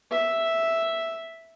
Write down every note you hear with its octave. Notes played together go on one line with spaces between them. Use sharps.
E5